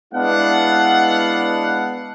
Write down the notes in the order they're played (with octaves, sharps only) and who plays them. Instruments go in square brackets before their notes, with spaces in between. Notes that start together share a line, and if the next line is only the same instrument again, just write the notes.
[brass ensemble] G#3 B3 D4 E4 F5 F#5